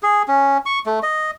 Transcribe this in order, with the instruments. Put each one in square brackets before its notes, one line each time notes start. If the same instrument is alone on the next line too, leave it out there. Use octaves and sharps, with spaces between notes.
[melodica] G#4
C#4
C#6
A3
D#5